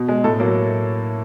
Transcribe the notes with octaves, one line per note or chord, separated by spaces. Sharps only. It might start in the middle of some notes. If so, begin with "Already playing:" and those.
Already playing: B2
G#3
A2 A4
F#3 A#3